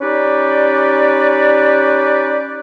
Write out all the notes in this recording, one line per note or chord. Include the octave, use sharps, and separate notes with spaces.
C#4 D#4 G4 B4 D5